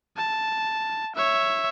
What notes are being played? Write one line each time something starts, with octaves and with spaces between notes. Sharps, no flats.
A5
C#5 E5